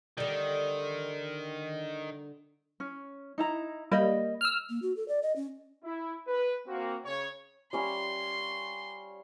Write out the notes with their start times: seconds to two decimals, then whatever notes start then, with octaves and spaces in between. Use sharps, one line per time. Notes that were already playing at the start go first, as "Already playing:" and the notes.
0.18 D3 D#3 G3
2.80 C#4
3.38 D#4 E4 A#5
3.92 G3 A#3 D#5 B5
4.41 E6 F6
4.70 A#3
4.82 F#4
4.97 A4
5.08 D5
5.23 D#5
5.36 C#4
5.83 E4
6.27 B4
6.66 A#3 C4 F#4
7.05 C#3 C#5
7.73 G3 C#4 F5 C6